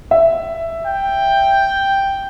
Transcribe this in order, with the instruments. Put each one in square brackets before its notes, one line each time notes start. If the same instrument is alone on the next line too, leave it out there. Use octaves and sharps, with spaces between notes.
[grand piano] E5
[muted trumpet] G5